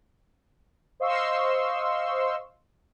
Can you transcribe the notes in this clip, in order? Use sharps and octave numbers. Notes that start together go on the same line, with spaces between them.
C5 D#5 F5 C6 C#6 E6